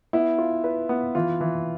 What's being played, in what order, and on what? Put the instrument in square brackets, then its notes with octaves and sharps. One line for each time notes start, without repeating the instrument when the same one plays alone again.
[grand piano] B3 [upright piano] E4
[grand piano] F4
B4
B3
[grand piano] E3 [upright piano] F4
[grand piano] E3